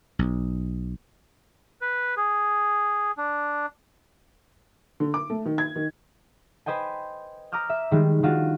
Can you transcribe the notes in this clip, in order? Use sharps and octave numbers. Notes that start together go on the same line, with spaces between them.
B1
B4
G#4
D4
D3
D6
A3
D#3
G#6
D#3
B4 C5 D#5 G5 G#5
A#5 D6 D#6 F6 G6
E5
D#3 G3 G#3
D#3 D4 F4 F#4